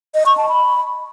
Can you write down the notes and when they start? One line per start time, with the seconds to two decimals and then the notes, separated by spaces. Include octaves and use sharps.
0.15 D#5
0.26 C#6
0.37 A5
0.49 B5